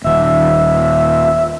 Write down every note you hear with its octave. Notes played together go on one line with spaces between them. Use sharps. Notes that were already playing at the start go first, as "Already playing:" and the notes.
D#1 D#3 E5